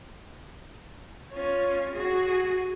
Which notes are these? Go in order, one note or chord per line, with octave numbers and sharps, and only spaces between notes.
C#4 F4
F#4 G#4